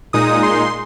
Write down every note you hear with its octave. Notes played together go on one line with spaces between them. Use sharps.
A#2 G#3 D#4 D#6
C6